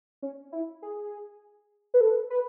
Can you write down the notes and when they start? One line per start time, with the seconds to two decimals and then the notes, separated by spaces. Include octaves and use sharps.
0.22 C#4
0.52 E4
0.82 G#4
1.94 B4
2.01 A4
2.30 B4